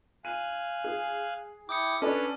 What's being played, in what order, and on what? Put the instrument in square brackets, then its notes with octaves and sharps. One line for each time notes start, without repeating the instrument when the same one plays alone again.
[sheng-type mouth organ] F5 G#5 F#6 [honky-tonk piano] D#7
[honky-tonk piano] G#4
[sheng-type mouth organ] E4 G5 [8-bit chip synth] D6 D#6 C#7
[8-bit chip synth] C#4 [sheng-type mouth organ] D4 B4 C#5 [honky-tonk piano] A4 D5